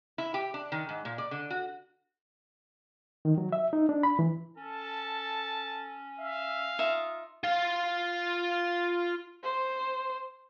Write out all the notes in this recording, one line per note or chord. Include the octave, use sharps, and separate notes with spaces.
E4
G4
D4
D#3
G#2
A#2
D5
D3
F#4
D#3
F#3
E5
D#4
D4
B5
E3
C#4 A4 A5
E5 F5
D#4 F4 E5 D#6
F4 F5
C5